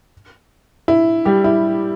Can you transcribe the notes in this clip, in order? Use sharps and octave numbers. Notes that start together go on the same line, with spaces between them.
E4
G3 G4
E4